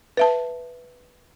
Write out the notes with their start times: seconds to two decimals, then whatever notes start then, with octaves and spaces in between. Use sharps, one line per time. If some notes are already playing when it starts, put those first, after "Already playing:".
0.17 B4 E5 A5